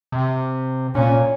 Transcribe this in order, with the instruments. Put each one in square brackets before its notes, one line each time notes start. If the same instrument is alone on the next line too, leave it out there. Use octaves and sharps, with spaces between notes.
[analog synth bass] C3
[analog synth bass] A#2 [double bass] C#4